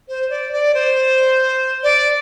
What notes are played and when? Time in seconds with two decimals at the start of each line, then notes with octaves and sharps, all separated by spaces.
0.09 C5
0.30 D5
0.52 D5
0.74 C5
1.83 D5